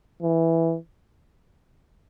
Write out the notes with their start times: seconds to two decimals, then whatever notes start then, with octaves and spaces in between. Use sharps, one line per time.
0.22 E3